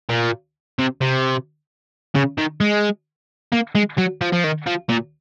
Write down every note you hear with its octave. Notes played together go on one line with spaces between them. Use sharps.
A#2
C3
C3
C#3
D#3
G#3
A#3
G#3
F#3
F3
F3
D#3
F3
A#2